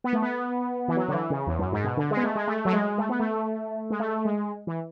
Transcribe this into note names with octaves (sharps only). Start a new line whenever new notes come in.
B3
A3
B3
E3
F#3
D3
E3
C#3
E2
F#2
G#2
B2
D3
G#3
B3
A3
G#3
A3
F#3
G#3
A3
B3
A3
G#3
A3
G#3
E3